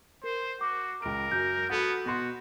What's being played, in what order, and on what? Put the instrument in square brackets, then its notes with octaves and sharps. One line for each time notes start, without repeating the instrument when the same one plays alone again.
[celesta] A#4 [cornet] C5
[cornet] F#4 [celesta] D6
[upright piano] C#2 D7 [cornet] A#4
[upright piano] F#2 [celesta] G6
[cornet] B3 [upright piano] F#4 A4 B5
[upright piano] B2 C6 [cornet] F#4